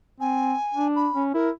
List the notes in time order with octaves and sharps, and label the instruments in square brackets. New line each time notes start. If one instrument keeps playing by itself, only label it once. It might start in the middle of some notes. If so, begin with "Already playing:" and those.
[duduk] C4 [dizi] G#5
[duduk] D4
[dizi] B5
[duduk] C#4
[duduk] E4 [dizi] A#4